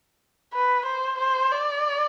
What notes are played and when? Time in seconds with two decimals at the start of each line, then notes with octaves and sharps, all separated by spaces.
0.53 B4
0.86 C5
1.19 C5
1.51 D5